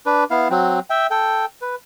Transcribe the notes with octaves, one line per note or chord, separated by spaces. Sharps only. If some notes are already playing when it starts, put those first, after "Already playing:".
D4 B4
B3 E4 F5
F#3 C4
E5 G5
A4 G5
B4